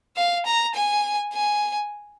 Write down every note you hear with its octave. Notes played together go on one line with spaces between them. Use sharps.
F5
A#5
G#5
G#5